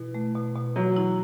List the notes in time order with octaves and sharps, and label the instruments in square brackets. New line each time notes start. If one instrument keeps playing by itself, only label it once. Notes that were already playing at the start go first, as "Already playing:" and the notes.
Already playing: [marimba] B2 [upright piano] E3
[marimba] A3
B2
B2
[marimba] E3 [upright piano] F#3
[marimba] E4